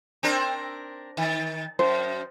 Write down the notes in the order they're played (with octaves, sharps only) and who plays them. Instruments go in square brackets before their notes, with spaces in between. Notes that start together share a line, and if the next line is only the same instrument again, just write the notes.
[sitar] C4 D4 A#4
D#3
[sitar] F#2 [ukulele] C5